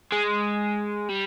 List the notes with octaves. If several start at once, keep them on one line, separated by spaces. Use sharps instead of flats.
G#3
G3